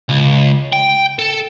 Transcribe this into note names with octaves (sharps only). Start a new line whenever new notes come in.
C#2
G5
A4